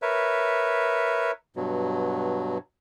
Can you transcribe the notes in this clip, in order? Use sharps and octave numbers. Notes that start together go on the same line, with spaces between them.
A#4 B4 C#5 E5
G2 B2 F#3